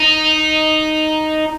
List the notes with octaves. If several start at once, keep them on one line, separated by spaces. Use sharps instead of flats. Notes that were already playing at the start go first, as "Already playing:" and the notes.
Already playing: D#4